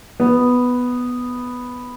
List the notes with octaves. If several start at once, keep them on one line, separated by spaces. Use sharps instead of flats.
B3